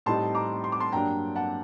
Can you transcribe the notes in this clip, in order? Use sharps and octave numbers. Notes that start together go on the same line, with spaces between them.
A2 G3 C4 D#4 A5 C6
A#5 D6
C6
D6
A5 C6
G2 F#3 A#3 D4 G5 A#5
F#5 A5